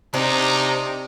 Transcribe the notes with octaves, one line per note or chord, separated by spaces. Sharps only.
C3 D4 D#4